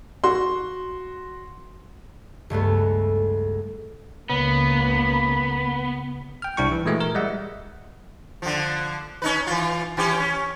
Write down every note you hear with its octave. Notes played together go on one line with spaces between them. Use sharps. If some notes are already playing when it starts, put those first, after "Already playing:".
F#4 C6
C#2 G2 A3 B3
C#2 C#3 A#3 B3 B5
G5 F6
C2 D4 E4 G5 C#6
E3
A#2 E3 G#3 A3 F#4
A#4
G3 G#3 D#5 E5 F#5
D3 F3
C#4 D#4 B4
E3 F4
E3 C#4 G4
C#4